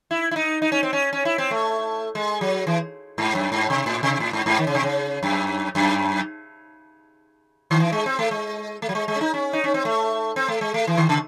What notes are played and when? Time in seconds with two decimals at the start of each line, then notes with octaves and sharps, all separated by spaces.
0.11 E4
0.31 E4
0.36 D#4
0.62 D#4
0.72 C#4
0.83 C4
0.93 C#4
1.13 C#4
1.25 E4
1.38 C4
1.51 A3
2.15 G#3
2.41 F#3
2.67 E3
3.18 G#2
3.35 F#2
3.52 G#2
3.70 C3
3.86 A2
4.03 C3
4.20 A2
4.33 G#2
4.46 G#2
4.58 D#3
4.67 C#3
4.75 C3
4.83 C#3
5.23 F#2
5.75 F#2
7.71 D#3
7.80 E3
7.92 G#3
8.06 C4
8.19 A3
8.31 G#3
8.82 A3
8.89 F#3
8.95 G#3
9.08 G#3
9.16 C#4
9.21 D#4
9.34 C#4
9.53 D#4
9.64 C#4
9.74 C4
9.85 A3
10.36 C4
10.48 A3
10.61 G#3
10.74 A3
10.87 E3
10.98 D#3
11.09 C#3